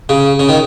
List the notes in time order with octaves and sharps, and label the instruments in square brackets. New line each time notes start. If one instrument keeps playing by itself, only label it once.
[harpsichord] C#3
C#3
D#3